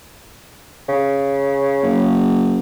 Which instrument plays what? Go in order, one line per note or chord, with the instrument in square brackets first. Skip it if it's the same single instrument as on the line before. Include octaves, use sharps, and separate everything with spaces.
[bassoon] C#3
[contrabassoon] F#1